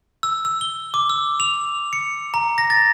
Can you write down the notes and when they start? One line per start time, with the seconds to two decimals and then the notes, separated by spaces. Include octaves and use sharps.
0.23 E6
0.45 E6
0.61 G7
0.94 D6
1.10 E6
1.40 F7
1.93 C#7
2.34 A#5
2.58 A#6
2.70 A6